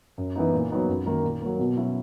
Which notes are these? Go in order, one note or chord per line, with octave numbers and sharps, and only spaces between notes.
F#2
E3 B3 D#4
A#2
F#3 B3 D#4
F#2
D#3 A#3 D#4
A#2
F#3 A#3
B2
F#3 C#4 E4